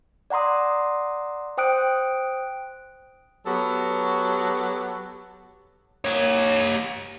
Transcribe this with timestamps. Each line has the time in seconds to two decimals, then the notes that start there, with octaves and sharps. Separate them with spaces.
0.30 D5 F#5 A#5 C6 D#6
1.58 C5 G5 D#6 F#6 D7
3.46 F#3 B3 F#4 G4 A4
6.04 G4 C#5